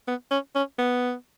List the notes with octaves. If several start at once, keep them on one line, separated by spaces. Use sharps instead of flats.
B3
C#4
C#4
B3